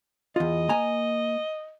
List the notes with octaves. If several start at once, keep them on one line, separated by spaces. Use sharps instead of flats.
E2 F4 D#5
A#3 G#5 A#5